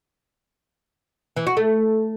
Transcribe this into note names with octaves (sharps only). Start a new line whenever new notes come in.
E3
F#4
A3